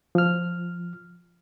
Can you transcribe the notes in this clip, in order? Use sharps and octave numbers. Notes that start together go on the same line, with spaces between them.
F3 F6